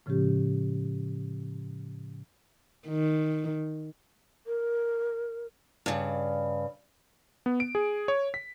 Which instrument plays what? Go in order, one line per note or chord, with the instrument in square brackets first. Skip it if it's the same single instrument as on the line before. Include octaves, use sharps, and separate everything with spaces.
[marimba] A2 C#3 F3 G#3 C#4 G4
[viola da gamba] D#3
[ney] A#4
[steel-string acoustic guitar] G2 C#3
[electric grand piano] B3
D7
G#4
C#5
B6